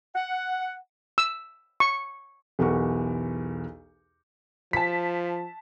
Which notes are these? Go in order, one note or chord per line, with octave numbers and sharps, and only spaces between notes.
F#5
E6
C#6
B1 E2 G4 A#4 F#5 C#6
F3 A5 B6